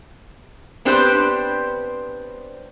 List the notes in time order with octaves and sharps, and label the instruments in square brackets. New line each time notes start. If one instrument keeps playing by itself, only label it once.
[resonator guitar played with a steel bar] B3 C4 D4 G4 B4 C5